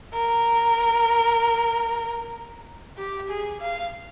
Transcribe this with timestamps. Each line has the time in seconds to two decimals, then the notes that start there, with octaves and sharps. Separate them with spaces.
0.13 A#4
2.98 G4
3.29 G#4
3.61 F5